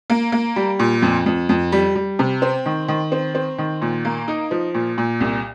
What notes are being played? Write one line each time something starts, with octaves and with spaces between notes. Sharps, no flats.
A#3
A#3
G3
A#2
F2
F2
F2
G3
G3
C3
C4
D#3
D#3
C4
C4
D#3
A#2
A#3
D#4
F3
A#2
A#2
C2